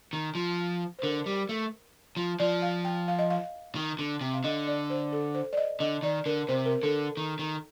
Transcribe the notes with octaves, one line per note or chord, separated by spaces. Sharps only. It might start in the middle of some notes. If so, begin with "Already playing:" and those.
D#3
F3
C5
D3 A#4
G3
A3
F3
F3 D5
F5
G5
F5
D#5
F5
D#3
D3
C3
F5
D3 D#5
D5
C5
A4
C5
D5
D#5
D3 D#5
D#3 D5
D3 A#4
C3 C5
A#4
D3 A4
D#3
D#3